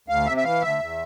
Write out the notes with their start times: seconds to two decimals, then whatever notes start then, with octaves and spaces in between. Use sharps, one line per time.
0.08 D2 F5
0.26 C3 E5
0.37 E5
0.44 E3 F5
0.61 D2 E5
0.79 E2